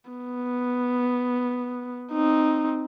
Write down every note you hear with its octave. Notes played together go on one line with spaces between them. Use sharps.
B3
C4 D#4